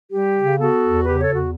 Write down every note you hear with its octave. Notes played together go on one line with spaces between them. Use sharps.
G3 G4
C#3
B3 F#4 A4
E2
C#3 G4 B4
A4 C#5
E2
F#4